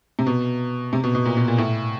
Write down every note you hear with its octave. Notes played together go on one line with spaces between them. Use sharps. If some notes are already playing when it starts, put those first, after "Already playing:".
C3
B2
C3
B2
B2
A#2
B2
A#2
A2